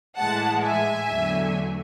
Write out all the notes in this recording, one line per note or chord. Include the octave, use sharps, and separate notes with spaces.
A2 E3 G#3 F#5 A5
E5 G#5
E2 D3 F#3 A3